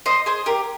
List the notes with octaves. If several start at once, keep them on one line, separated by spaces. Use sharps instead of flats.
C5 D#5
G#4 C5
G4 A#4